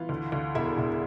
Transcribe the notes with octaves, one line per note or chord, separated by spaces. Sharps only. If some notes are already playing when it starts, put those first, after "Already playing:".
Already playing: E3 F4 F5
D2
D2
E1 E4 E5
E1